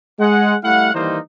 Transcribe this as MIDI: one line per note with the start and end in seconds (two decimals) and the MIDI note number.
0.20 0.55 56
0.20 0.55 78
0.64 0.90 55
0.64 0.90 57
0.64 0.90 64
0.64 0.90 77
0.64 0.90 78
0.95 1.18 51
0.95 1.18 52
0.95 1.18 55
0.95 1.18 58
0.95 1.18 63
0.95 1.18 72